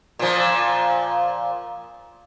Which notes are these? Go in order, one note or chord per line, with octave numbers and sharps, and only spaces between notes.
A#2 F3